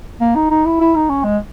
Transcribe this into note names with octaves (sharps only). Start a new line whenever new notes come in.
A#3
D#4
D#4
E4
E4
D#4
C#4
G#3